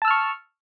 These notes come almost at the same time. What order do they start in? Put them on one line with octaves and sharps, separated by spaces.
A5 E6 F6 C#6